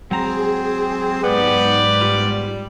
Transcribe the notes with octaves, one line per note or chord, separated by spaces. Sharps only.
F#3 G#3 C4 G#4 A#5
G#2 B3 G4 B4 D5
G3 B3 F4